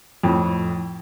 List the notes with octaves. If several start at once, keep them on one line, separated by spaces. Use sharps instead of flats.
F2 A2